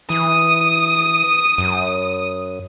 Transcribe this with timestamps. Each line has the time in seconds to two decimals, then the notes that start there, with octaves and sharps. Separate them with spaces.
0.10 E3 D#6
1.58 F#2